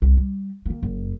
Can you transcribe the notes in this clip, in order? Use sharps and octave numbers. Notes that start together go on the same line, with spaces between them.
C2
G3
D#3 A#3
F#1 F#2